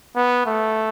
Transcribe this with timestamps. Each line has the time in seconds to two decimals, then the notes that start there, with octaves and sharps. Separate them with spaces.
0.16 B3
0.46 A3